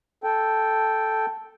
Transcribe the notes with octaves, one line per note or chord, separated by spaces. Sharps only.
A4 G5